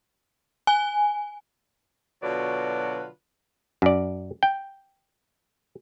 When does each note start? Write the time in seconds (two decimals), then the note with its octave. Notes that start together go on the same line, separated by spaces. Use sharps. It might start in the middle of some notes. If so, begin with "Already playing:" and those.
0.67 G#5
2.23 B2 D3 F#3 F4 B4 D5
3.82 F#2 D5
4.43 G5